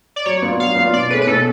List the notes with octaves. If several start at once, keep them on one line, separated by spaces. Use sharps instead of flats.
D5
F#3 C#5
B3 D4 F4
F#3 F5
B3 D4 F4
B2 D5
A3 C#4 G#4 B4
B4
B2 A4